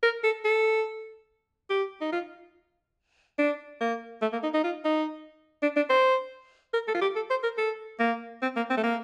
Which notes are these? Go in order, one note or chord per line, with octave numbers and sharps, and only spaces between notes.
A#4
A4
A4
G4
D#4
F4
D4
A#3
A3
A#3
D#4
D#4
F4
D#4
D4
D4
C5
A#4
A4
F4
G4
A4
C5
A#4
A4
A#3
C4
A#3
C4
A3
A#3